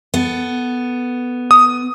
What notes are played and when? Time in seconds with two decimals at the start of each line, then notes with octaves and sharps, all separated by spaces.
0.14 B3 A4
1.51 D#6